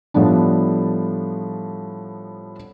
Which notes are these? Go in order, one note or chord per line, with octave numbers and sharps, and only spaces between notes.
A2 F3 G3 B3 D4